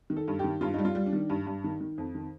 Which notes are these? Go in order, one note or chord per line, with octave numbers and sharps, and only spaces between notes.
D#3
A4
G2
D#3 G4
G2 F4
G3 D#4
F4
G3
D4
D#3
G2
G2
D#3
D#3
F2
D#3